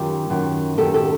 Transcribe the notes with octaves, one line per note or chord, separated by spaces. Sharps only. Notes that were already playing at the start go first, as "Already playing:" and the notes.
Already playing: F#2 D#3 F4 G4
F#2 D#3
F#2 D#3 G4 A4
G4 A4